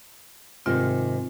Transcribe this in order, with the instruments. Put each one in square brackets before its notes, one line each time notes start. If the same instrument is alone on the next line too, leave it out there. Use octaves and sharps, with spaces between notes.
[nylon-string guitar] G#2 C3 D#3 [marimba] C4 F4